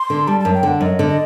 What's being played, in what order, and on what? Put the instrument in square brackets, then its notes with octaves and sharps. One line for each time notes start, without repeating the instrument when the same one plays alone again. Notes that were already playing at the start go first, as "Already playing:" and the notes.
Already playing: [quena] C6
[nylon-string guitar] D3
[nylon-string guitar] G3 [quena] A5
[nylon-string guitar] F#2 [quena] A5
[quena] G5
[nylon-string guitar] D3 [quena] F#5
[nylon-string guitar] F#2 [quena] D#5
[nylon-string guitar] D3
[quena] D#5